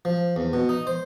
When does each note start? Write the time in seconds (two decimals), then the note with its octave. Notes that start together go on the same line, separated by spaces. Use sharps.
0.05 F3
0.36 E2
0.53 B2
0.69 D#4
0.87 C5